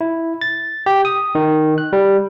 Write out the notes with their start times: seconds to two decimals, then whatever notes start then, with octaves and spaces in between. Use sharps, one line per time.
0.01 E4
0.41 A6
0.86 G4
1.05 D#6
1.35 D#3
1.78 F#6
1.93 G3